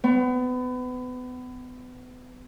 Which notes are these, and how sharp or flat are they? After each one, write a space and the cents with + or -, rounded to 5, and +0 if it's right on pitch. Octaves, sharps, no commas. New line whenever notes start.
B3 +30